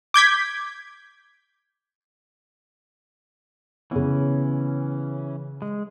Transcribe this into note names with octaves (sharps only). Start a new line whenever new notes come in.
D6 G6 G#6 B6
C#3 E3 B3 C#4
G#3